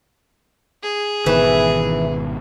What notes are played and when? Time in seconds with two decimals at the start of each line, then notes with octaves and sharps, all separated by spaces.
0.83 G#4
1.26 G#1 B2 D#3 E3